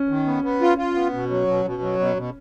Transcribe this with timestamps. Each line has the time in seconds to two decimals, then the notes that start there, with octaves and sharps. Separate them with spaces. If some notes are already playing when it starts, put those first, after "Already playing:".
Already playing: C#4
0.09 D#3
0.26 B3
0.44 B3
0.61 F4
0.78 F4
0.95 B3
1.13 B2
1.30 F#3
1.47 B2
1.65 B2
1.82 F#3
1.99 B2
2.17 B2